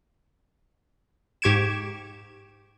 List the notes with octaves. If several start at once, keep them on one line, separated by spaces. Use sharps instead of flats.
G#2 G4 C#6 G#6 D7 E7